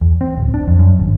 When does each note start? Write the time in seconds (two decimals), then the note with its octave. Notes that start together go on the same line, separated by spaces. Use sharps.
0.01 E2
0.21 C4
0.37 D1
0.54 D4
0.68 F2
0.79 F#2
1.00 G#1